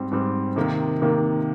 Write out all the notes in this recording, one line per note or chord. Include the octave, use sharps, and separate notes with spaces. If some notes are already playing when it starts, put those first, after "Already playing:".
Already playing: G#2 G3 C4
G#2 G3 C4
C3 D#3 A#3
C3 D#3 A#3